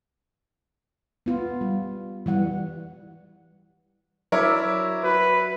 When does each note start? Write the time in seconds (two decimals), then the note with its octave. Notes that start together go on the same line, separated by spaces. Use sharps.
1.26 B3 F4
1.61 G3
2.26 E3 G3 F#5
4.32 F#3 E4 A#4 C#5 D5 E5
5.04 F#4 B4